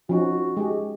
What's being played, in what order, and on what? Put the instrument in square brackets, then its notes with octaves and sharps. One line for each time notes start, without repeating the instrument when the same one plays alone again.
[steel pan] F3 C#4 D#4 [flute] F#4
[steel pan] G#3 G4 G#4